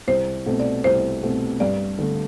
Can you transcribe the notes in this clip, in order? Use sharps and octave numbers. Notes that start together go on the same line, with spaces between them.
C2 C5
B2 A3 C4
D5
C2 C5
B2 A3 C4
G2 D5
D3 A3